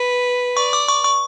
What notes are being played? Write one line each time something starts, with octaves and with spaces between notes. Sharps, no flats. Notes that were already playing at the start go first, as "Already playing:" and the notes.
Already playing: B4
D5 C#6
D6
C#6
C#6